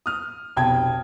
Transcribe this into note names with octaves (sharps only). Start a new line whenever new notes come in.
D#6 F6
F1 B1 G5 A5 G#6